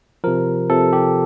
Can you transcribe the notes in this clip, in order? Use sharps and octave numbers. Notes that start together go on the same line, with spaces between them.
C3 F3 A#4
C3 F3 A4
G4